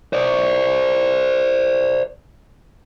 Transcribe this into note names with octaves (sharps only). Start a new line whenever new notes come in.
C5 D5